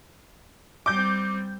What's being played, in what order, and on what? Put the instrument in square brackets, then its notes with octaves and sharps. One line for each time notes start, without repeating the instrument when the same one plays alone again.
[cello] G3 C4 [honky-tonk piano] D6 G6